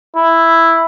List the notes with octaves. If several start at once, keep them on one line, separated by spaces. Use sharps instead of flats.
E4